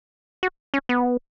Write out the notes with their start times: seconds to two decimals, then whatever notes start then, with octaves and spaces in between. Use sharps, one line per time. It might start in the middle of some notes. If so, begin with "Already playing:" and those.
0.43 F#4
0.74 C#4
0.89 B3